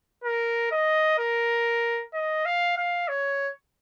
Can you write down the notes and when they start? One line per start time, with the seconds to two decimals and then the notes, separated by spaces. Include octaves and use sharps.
0.24 A#4
0.71 D#5
1.19 A#4
2.14 D#5
2.46 F5
2.77 F5
3.09 C#5